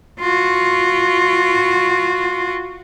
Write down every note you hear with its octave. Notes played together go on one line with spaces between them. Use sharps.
F4 F#4